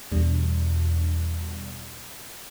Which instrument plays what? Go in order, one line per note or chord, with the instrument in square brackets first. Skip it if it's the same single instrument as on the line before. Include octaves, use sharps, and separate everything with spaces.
[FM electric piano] E2 B2 G3 D4